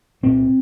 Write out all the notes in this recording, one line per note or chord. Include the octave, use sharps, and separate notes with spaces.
C2 A#2 C4